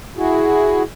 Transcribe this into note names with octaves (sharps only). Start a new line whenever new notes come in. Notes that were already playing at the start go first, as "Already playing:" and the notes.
E4 F#4 G#4